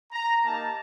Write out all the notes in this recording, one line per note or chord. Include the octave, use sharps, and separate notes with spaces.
A#5
A#3 D#4 G4 A5